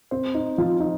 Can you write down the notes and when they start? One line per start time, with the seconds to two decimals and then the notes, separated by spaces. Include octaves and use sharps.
0.11 C4 C5
0.34 D#4
0.58 F3 F4
0.80 D#4